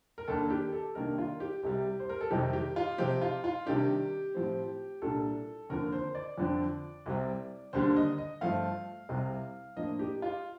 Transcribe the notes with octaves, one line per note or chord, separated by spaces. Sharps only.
A#4
D#2 D#3 A#3 D4 A4
G4
A4
C2 C3 D#3 A#3 D4 A#4
F4
G4
C2 C3 G3
C5
A#4
A4
F2 C3 D#3 G3 C4 G4
G4
F4
C3 F3 C4 G4
F4
F4
C3 D#3 G3 D4 G4
A2 F3 C4
C2 A#2 G3 D4 A4
D#2 D3 F3 C4 A#4
C5
D5
F2 D3 F3 C4
C2 C3 G3 C4
D#2 D3 G3 A#3 D4 C5
D#5
D#5
G2 F3 A3 F5
C2 C3 G3 C4
A2 F3 A#3 D4 D#5
G4
F4